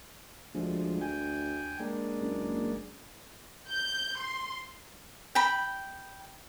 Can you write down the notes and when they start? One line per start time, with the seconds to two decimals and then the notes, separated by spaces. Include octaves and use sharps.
0.55 D2 F3 G#3
1.01 G5 G#5
1.80 G#3 A#3 D4
2.21 F#1
3.68 G6
4.19 C6
5.35 G5 B5